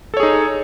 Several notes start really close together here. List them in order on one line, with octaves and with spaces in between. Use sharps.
A4 C#5 G#4 D#4